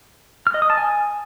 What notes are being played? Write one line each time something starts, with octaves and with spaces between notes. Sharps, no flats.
F6
D#5
D#6
A5
G#5